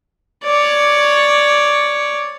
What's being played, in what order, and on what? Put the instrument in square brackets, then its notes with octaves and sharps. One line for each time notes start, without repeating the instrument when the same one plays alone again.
[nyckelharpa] C#5 D5